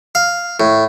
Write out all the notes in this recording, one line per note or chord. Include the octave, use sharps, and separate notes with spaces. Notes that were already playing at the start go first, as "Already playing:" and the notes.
F5
A2